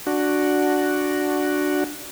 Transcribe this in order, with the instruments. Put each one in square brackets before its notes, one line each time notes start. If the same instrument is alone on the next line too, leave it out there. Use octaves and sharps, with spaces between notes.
[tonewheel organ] D4 F#4